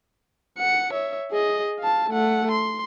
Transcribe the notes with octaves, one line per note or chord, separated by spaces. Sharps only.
F#5 C#7
C#5 E5
G#4 D#5
F5 A5
A3 F#5
C6